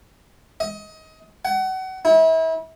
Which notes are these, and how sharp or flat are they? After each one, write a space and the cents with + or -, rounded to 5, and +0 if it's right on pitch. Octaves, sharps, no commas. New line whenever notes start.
D#5 +25
F#5 +30
E4 -35